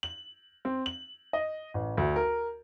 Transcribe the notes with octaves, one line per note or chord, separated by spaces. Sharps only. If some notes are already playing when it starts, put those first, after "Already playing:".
F#7
C4
F#7
D#5
A1
D2
A#4